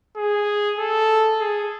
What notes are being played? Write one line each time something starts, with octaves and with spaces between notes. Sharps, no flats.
G#4
A4
G#4